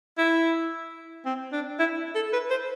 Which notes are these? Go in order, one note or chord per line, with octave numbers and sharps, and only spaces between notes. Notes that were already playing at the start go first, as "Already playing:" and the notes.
E4
C4
D4
E4
A4
B4
C5